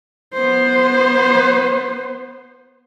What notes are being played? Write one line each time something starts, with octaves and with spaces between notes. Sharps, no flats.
B3 C5